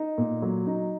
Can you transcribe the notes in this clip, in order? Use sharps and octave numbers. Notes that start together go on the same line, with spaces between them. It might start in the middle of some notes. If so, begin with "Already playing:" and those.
Already playing: D#4
A#2
F#3
D#4